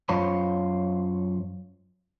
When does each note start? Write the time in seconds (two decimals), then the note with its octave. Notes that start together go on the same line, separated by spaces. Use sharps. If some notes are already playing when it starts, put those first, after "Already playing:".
0.09 F#2 F4 C5 C#5 B5